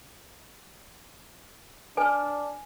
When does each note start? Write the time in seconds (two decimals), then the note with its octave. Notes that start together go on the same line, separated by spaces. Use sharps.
1.97 D4 B4 C5 G#5